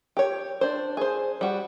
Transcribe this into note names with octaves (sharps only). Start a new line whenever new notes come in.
G4 C#5
D4 C5
G#4 C5
G3 F#4